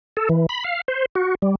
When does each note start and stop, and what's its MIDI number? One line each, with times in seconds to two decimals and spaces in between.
0.17 0.29 69
0.29 0.46 52
0.49 0.64 83
0.64 0.81 77
0.88 1.05 72
1.15 1.35 66
1.42 1.55 55